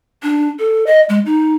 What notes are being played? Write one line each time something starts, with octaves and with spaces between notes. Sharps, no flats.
D4
A4
D#5
G#3
D#4